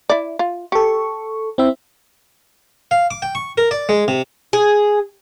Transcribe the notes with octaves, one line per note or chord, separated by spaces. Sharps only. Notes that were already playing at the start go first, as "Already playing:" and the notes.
E4 D5
F4
G4 A4 C#6
C4 E4 E5
F5
D6
G5
C#6
A#4
D5
G#3
C3
G#4